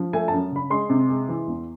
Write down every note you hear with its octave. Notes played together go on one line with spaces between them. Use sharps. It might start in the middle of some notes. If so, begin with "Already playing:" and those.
Already playing: F3
A3 G#5
F#2 A5
C#3 B5
G#3 C6
C3
G#3
E3
E2